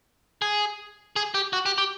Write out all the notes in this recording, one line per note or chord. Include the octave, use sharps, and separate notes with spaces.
G#4
G#4
G4
F#4
G4
G4